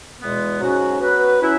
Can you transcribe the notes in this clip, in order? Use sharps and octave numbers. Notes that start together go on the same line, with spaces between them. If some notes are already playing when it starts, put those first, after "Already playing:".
E2 B2 G#3 B3
G#2 F#3 C#4 F#4
F#3 B3 F#4 B4
F#3 C#4 E4